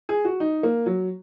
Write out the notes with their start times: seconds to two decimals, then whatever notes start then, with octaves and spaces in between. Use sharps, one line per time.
0.09 G#4
0.25 F#4
0.40 D#4
0.63 A#3
0.86 F#3